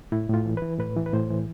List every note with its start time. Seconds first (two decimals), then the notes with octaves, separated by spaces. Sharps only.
0.12 A2 E4
0.29 A2 F4
0.46 E3
0.57 B4
0.62 E3
0.79 A2 B4
0.97 E3
1.06 B4
1.13 A2 C5
1.30 E3